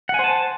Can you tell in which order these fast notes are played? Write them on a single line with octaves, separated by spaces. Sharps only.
F#5 G#5 C5 A5